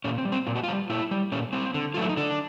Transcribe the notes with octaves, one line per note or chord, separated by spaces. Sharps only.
A#2 C#4
C4
G3
C4
A#2 F4
F#4
F4
G3
A#2 E4
G3
A#2 C#4
G3 C4
D3
F#3 A3 F4
E4
D#4
D3 D4